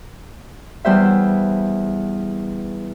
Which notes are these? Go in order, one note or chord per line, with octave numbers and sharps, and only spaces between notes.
E2 G3 C5 E5